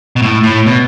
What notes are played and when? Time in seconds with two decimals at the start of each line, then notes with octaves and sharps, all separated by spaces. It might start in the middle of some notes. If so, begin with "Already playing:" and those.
0.16 B2
0.22 A2
0.43 A2
0.66 B2